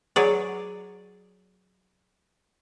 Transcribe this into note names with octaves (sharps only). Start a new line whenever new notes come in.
F#3 G#4 C#5 D5